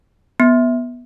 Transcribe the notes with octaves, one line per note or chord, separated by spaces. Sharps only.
B3